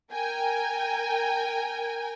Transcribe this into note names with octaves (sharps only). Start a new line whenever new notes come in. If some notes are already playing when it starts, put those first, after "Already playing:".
A#4 G5 G#5